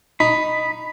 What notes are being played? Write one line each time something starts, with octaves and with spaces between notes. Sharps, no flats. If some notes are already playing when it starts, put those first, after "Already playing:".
D#4 B5